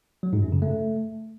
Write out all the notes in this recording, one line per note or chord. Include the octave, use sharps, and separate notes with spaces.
F#3
G#2
F#2
C#3
A3